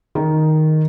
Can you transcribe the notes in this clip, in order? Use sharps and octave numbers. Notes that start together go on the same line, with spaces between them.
D#3